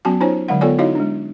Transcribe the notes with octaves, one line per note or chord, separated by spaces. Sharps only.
F#3 B3 C#4 F#4 G#5 A5
C#4 D#4 F4 C5 C#5 G#5
D3 F#3 G#3 F5 F#5
B3 F4 A4 C#5 D5 G#5
D#4 E4 F#4 C#5 D#5 F5
G#3 D4